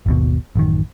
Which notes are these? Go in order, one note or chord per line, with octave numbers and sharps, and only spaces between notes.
G#1 D#2 B2
A1 F#2 D#3